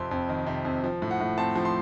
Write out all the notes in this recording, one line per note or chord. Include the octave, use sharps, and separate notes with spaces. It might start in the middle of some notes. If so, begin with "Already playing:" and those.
Already playing: F2 C3 C6
F2
D#3
C3
F2
F3
A2
F#5
A2
C4 A5
F3
C6